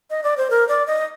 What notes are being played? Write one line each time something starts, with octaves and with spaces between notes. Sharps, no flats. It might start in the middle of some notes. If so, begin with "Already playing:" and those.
D#5
D5
C5
A#4
D5
D#5